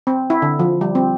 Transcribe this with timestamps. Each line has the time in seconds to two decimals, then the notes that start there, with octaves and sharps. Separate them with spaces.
0.07 C4
0.30 E4
0.42 D3
0.59 F3
0.81 G3
0.95 C4